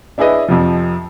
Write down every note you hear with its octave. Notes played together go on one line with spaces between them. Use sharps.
D4 E4 G#4 B4 D#5 E5
F2 C3 F3